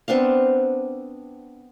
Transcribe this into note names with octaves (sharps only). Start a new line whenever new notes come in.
B3 C4 D4 F5